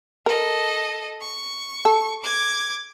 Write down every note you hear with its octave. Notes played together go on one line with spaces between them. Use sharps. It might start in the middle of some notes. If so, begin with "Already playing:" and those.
A4 A#4 D#5
C#6
A4
D6 G#6